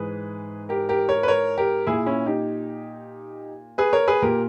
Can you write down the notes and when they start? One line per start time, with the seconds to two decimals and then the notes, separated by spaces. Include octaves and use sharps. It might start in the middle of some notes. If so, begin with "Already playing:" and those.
Already playing: G#2 E3 G#4 B4
0.69 G4 A#4
0.89 G4 A#4
1.09 A#4 C#5
1.23 B4
1.28 A#4 C#5
1.57 G4 A#4
1.87 A#2 E4 G#4
2.06 C#4 E4
2.26 D#4 G4
3.78 G#4 B4
3.93 A#4 C#5
4.08 G#4 B4
4.22 A#2 G4 A#4